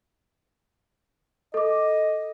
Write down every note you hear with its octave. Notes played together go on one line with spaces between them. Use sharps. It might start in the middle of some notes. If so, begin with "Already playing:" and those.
A4 D#5 D6